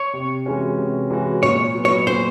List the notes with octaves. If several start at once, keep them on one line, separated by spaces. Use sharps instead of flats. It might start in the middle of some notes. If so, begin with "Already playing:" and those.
Already playing: C#5
C3
E3 G#3 C#4 F#4
C3
E3 G#3 C#4 F#4
A#2 C#5
F#3 B3
C#5
A#2 C5